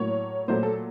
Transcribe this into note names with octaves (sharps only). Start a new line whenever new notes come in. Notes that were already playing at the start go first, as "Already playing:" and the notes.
Already playing: A2 F#3 A#3 C#5
A#2 F#3 A3 C5
A4